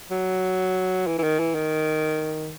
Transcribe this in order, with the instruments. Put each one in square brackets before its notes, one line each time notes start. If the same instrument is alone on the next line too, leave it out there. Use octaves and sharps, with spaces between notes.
[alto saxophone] F#3
E3
E3
D#3
E3
D#3